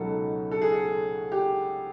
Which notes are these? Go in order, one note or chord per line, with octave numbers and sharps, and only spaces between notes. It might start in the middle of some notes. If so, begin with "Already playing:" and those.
Already playing: C#2 B2 F#3 B3 D#4 A4
A4
G#4
A4
G4